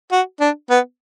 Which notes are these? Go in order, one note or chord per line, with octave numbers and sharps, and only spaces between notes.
F#4
D4
B3